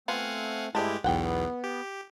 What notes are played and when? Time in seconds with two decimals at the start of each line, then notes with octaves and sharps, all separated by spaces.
0.08 A3 B3 C4 F4 F5 F#5 G#5
0.75 G2 G#3 A3 E4 G4 D5 F5 A5
1.04 B1 E2 B3 F#5 G5
1.64 G4